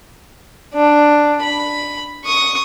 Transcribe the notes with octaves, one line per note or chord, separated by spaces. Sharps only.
D4
B5
C#6 D#6